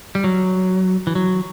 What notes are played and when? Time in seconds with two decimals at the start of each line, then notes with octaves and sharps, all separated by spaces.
0.15 G3
0.24 F#3
1.07 E3
1.15 F#3